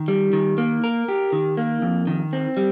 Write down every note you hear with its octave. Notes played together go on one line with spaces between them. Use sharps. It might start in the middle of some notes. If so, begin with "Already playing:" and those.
Already playing: D#3
G3
D#3
A#3
A#4
G4
D#3
A#3
F2
D#3
C4
G3